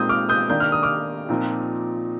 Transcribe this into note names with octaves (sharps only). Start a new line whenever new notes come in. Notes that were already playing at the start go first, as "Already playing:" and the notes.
Already playing: A#2 G#3 C4 D#4 D#6 G6
D6 F6
D#6 G6
D#3 A#3 D4 G6
F6
D#6
D6 F6
A#2 F3 C4 D#4